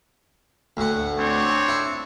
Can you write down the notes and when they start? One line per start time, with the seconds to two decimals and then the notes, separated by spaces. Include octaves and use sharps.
0.77 D2 A2 F#5
1.18 C4 D4 C#5
1.68 E4